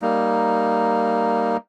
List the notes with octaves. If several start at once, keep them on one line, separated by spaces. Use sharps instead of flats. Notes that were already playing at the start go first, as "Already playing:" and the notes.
G3 A#3 D#4